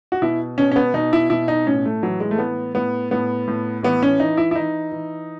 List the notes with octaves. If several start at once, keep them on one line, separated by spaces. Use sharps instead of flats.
F#4
B2 E4
B2 C#4
C#4
B3
B2 D#4
E4
B2 E4
D#4
A2 C#4
A3
E3 F#3
G#3
A3
A2 B3
A2 B3
A2 B3
A2
E3 B3
C#4
E3 D#4
E4
E4
E3 D#4
E3